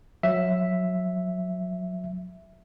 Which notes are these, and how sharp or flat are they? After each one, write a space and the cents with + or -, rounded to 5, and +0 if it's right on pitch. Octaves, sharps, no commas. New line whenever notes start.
F#3 -25 E5 +0